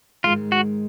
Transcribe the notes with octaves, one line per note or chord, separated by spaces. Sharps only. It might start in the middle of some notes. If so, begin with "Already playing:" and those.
G#2 D#3 G#3 F4
F#4